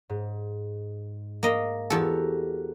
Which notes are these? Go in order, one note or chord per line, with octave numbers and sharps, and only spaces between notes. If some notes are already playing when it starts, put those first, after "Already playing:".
G#2
A#3 D#5
E2 F#4 G4 A4 A#4